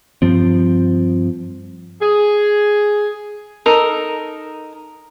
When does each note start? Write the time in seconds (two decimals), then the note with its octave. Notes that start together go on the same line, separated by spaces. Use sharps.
0.22 G2 F3 C4
2.02 G#4
3.66 D#4 A4 A#4 D#5